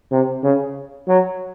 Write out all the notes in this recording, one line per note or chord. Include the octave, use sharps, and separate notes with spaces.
C3
C#3
F#3